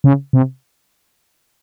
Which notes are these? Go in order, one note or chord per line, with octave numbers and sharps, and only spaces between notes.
C#3
C3